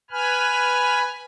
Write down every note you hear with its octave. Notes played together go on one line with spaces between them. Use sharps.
B4 G#5 B5 F6